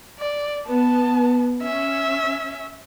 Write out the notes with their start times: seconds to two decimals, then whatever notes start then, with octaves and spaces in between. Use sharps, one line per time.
0.19 D5
0.68 B3 A5
1.63 C#4 E5